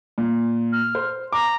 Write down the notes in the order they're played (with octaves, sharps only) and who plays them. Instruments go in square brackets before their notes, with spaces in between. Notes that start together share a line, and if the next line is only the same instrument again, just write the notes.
[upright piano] A#2
[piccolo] F6
[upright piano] C5
[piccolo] A#5 [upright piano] D6